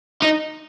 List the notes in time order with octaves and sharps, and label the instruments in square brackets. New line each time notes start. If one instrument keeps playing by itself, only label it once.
[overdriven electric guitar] D#4